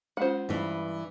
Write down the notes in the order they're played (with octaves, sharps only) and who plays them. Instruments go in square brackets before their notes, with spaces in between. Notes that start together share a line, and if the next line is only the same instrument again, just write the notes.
[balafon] G#3 C#4 F4 [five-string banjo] C5 F#5
[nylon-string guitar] G2 E3